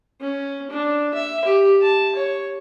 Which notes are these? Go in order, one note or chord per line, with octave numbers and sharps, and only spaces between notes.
C#4
D4
E5
G4
A5
C#5